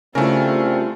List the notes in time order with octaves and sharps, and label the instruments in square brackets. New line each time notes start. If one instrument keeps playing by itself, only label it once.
[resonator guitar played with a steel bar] C#3 E4 [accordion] G3 C4 [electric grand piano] A3 A#4 [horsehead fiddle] F4